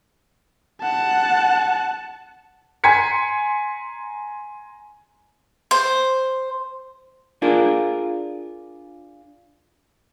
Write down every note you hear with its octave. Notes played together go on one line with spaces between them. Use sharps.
F#5 A5
G#5 A#5 C6 G#6 B6 C#7
C5
D4 F4 G#4 A#4